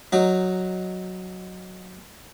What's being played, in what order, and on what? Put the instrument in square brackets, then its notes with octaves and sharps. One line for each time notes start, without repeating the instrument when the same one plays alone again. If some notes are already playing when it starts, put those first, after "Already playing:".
[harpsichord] F#3 D#4